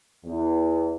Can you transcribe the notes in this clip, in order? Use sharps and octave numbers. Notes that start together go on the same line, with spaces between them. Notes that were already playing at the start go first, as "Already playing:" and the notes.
E2